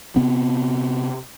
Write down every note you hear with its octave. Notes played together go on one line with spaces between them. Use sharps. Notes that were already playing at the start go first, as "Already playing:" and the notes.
C3 B3 C4